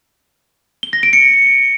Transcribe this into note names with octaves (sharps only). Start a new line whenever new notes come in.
G7
A#6
D7
C#7